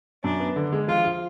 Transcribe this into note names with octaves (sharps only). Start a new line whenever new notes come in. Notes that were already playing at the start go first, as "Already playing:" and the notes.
F#2 D4
B3
D3
G#3
F3 F4
F4